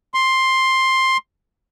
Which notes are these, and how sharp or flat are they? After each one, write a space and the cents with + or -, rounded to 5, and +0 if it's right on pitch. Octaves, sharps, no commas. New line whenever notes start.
C6 +10